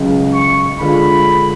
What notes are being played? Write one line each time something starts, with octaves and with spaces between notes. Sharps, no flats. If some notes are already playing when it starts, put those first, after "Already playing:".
Already playing: C#2 C#3 F#3
C#6
D3 G#3 D4 F4 B5